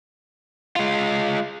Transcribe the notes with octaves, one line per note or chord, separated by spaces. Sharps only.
G#3 F4